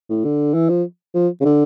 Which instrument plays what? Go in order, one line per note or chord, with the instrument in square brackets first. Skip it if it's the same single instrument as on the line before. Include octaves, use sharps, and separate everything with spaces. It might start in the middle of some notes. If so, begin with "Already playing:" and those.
[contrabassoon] A2
D3
E3
F3
F3
C#3
D3